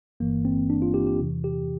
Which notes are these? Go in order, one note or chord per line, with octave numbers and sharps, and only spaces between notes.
G1 G2 E3 A#3
C4
D4
F4
G4
G4
E2 C3 E3
G4